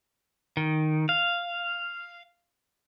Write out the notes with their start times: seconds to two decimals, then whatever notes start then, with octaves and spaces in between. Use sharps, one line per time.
0.57 D#3
1.09 F5